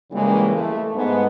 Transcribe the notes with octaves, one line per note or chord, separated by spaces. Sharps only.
A2 C#3 E3 G3 G#3 A#3
A3
G#2 B3